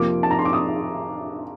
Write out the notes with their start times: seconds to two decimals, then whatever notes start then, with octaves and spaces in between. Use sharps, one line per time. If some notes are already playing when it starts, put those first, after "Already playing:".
Already playing: F2 C3 F3 A#3 F4 D6
0.23 A5
0.31 A#5
0.39 C6
0.45 D6
0.53 D#6